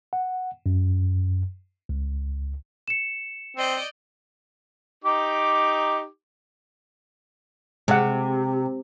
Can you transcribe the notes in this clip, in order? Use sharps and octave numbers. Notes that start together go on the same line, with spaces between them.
F#5
F#2
C#2
C#7 E7
C4 D5 D#5 G6
D#4 G4 D6
C3 G#3 F#5